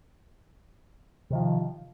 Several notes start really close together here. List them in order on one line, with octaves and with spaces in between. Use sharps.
C3 D#3 F3